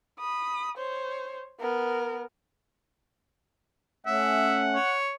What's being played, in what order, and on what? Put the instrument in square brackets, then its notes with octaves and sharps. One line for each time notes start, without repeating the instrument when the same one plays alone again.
[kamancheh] B5 D#6
C5 C#5
B3 A#4
[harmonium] A3 C#4 [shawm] E5 [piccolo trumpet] F#5
[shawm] C#5